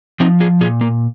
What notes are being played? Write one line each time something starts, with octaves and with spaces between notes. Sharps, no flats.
F3 C4 D#4
F4 G#4
A#2 F4 G#4
A#3